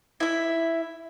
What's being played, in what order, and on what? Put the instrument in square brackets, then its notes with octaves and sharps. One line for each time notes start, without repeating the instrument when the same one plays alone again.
[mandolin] E4 E5